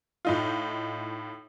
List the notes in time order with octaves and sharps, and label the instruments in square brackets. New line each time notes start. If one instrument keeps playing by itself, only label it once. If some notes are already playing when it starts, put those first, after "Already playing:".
[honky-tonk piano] A2 D#4 F4